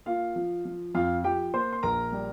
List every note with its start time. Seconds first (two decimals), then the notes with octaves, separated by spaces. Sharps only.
0.06 A#3 F4 F5
0.36 F3
0.65 F3
0.95 F2 F4 F5
1.24 F3 G4 G5
1.53 A#3 C5 C6
1.73 C6
1.83 A#1 A#4 A#5
2.12 G3